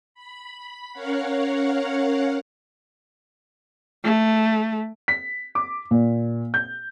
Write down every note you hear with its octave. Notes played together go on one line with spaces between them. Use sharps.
B5
C#4 A#4 C#5 F5 F#5
A3
B6
D6
A#2
G6